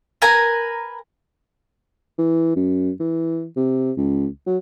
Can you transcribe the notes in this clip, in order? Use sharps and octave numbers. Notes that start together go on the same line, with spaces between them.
A#4 B4 G#5 A#5
E3
F#2
E3
C3
C#2
F#3